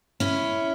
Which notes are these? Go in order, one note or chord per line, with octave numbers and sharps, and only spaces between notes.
C#4 E4